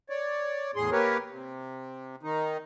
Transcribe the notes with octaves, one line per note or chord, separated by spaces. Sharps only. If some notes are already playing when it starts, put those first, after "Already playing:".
C#5 D5
E2 A2 G#4 C6
A#3 G4 A#4 B4 C#5
C3
D#3 D#4